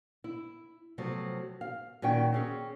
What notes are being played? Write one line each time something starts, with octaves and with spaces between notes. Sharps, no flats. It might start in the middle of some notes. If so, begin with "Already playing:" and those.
E4
C3 F3 F#3 A3 B3
F5
A#2 D#3 C#4 F#4 G5
C4 C#4 G#4